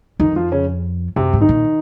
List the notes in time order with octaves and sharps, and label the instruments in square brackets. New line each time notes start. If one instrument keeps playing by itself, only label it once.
[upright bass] F2 [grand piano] D#3 D#4
[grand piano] F3 F4
C#3 C#4
[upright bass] F#2 [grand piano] C3 C4
[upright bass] G#2
[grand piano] D#3 D#4
[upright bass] A#2